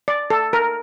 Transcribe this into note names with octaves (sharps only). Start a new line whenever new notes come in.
D5
A4
A#4